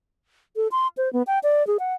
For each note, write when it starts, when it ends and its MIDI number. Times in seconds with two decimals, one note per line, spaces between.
0.56 0.68 69
0.72 0.88 84
0.97 1.11 72
1.13 1.23 59
1.27 1.39 79
1.43 1.66 74
1.67 1.77 68
1.79 1.94 78